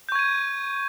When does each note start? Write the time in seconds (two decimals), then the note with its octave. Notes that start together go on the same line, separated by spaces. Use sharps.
0.09 G6
0.12 C#6
0.15 G#6
0.19 D#7